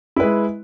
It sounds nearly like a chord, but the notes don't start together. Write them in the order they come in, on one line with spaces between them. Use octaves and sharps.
E4 B4 G#3